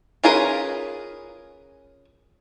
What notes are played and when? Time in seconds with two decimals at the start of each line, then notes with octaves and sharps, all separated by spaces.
0.24 C#4 F4 G#4 A#4 B4